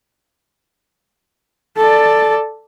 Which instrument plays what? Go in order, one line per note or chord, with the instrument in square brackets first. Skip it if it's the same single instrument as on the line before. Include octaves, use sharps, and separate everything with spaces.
[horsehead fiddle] A4 D5